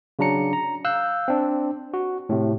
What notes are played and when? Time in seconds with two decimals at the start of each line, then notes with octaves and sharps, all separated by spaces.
0.19 C#3 F#3 D4 A#5 C#7
0.53 A#5
0.85 F5 E6 F#6 G6
1.28 C4 D4
1.94 F#4
2.29 A2 C3